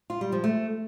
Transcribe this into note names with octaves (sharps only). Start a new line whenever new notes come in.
F4
G3
F3
A3